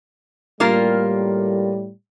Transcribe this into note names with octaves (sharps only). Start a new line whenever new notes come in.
A2 G3 A#3 F4 A#4